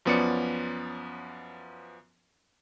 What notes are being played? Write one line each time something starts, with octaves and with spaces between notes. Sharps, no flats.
F#2 F3 B3 C#4 D5 C#7